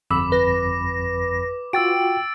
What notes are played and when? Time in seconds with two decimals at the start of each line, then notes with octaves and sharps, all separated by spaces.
0.11 G1 F2 B5 D6 E6
0.32 B4 A#6
1.73 F4 F#4 G5 E6 A6 D7